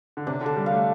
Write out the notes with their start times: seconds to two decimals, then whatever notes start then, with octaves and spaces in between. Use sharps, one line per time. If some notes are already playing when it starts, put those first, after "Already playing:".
0.17 D3
0.27 C3 D4
0.41 D3
0.46 A4
0.57 G3
0.66 A3 F5